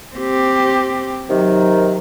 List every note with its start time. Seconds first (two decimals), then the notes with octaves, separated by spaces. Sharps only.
0.16 C4 G4
1.30 C3 D#3 F#3